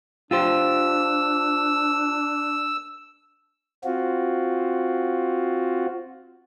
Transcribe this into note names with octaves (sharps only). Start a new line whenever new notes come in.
D4 F4 G4 C5 E6
C4 F4 F#4